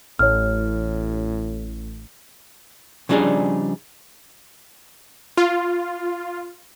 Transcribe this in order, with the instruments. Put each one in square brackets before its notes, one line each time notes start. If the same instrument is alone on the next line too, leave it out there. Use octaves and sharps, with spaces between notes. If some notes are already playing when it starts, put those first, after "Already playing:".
[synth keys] A1 [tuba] A2 [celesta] C#5 F6
[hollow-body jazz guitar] C#3 F3 G3 D4 D#4 G#4
[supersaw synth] F4